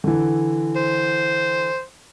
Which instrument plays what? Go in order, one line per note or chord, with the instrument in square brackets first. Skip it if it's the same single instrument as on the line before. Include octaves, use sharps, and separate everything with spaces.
[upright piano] D3 E3
[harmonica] C5